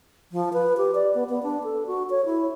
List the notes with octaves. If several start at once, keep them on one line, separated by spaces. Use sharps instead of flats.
F3
B4
G4
D5
B3
B3
D4
A4
F#4
C#5
E4